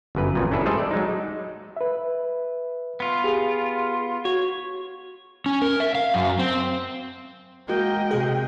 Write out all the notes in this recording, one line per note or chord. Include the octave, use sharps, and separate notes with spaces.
G1 F#2 B4
A1 F2 A#2
C#4 D4 E4 A4 B4
G3 A3 G#4 A4 C5 D#5
D5
F#3 G#3 D#4
B4 E5
B3 F4
G4 G#4
F#4 C#5
C#4
A#4
E5
F5
F#2
C4
G#3 A#3 F#4 D#5 G5
C3 G#4